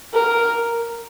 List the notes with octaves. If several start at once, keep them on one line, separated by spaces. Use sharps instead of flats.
A#4